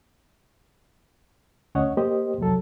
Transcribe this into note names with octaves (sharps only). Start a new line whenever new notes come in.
D2 C#4 C#5 D#5 F#5
A#3 G4 C5 D#5
C2 F2 F#3 A4